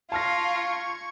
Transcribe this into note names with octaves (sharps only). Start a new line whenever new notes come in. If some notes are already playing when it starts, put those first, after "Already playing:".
F4 A5 C#6 F6 G#6 A#6